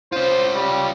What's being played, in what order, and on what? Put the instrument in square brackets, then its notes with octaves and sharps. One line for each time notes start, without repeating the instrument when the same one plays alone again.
[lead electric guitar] C#4 F4 [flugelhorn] C5
[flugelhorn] G3